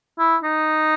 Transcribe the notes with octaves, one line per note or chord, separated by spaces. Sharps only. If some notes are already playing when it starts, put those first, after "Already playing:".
E4
D#4